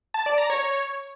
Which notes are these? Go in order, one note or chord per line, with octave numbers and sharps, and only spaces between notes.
A5
D5
A#5
C#5